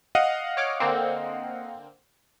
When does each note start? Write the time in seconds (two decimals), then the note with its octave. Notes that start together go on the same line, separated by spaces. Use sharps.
0.15 D#5 F5 F#5 D#7
0.57 C#5 D6 F6
0.80 D3 A#3 C4